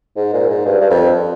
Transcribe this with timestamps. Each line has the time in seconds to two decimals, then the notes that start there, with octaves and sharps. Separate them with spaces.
0.17 G#2
0.33 A#2
0.50 G#2
0.65 G2
0.81 G2
0.90 F2